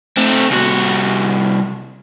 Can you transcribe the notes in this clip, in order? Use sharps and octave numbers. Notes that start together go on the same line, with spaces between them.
A3 C4
C2 F#4